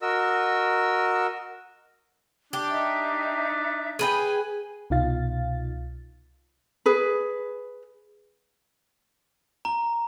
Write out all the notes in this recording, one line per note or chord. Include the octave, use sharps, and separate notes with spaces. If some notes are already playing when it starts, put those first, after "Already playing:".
F#4 A#4 D#5 E6
D4 G4
D#4 E5
G#4 B4 G5 G#5
C2 B2 D#4 F4 F5 A6
G#4 B4
A#5